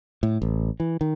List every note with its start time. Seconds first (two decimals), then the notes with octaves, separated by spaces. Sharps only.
0.23 A2
0.42 A1
0.80 E3
1.01 D#3